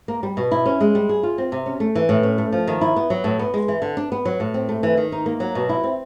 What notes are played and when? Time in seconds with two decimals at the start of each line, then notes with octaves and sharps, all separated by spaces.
0.08 A#3
0.23 G3
0.37 B2
0.51 E4
0.66 C#4
0.81 G#3
0.95 G3
1.09 G#4
1.23 F4
1.38 C4
1.52 C3
1.66 C#4
1.80 A3
1.95 E3
2.09 A2
2.23 C#4
2.38 A3
2.53 F3
2.67 D#3
2.81 E4
2.96 B3
3.10 F#3
3.24 A2
3.39 B3
3.54 G#3
3.68 E3
3.82 D3
3.97 D4
4.12 B3
4.25 F#3
4.40 A2
4.54 C4
4.69 A3
4.83 E3
4.97 D#3
5.12 D#4
5.26 A#3
5.40 F#3
5.55 B2
5.69 E4
5.83 C4